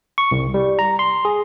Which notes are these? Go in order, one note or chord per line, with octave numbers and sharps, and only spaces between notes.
C#6
C2
G3
A#5
C6
G#4